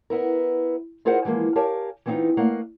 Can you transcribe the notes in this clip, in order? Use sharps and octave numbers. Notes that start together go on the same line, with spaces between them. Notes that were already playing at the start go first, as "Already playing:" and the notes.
B3 E4 A#4
E4 F4 G#4 A#4 C5 F#5
E3 F3 G#3 A#3
G4 A#4 C#5 F5 G#5 A5
E3 B3 C4 D4 D#4 F4
A3 A#3 D#5 F5 F#5